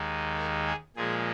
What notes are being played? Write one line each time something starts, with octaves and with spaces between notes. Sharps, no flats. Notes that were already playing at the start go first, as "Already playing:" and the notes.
Already playing: D#2 D#3 G#3
A#4
G#4
A#2 F3 G#3 G#4